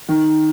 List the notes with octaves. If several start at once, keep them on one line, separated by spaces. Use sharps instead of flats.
D#3